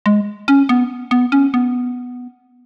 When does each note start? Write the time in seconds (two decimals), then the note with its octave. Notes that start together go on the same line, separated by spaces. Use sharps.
0.06 G#3
0.48 C#4
0.69 B3
1.11 B3
1.32 C#4
1.54 B3